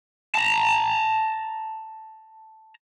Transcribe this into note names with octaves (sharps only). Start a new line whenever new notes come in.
A5 A#5